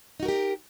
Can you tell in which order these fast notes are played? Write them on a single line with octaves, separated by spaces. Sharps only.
D#4 F#4 A#4 G4